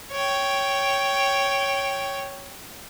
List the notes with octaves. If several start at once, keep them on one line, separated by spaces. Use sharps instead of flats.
C#5 G5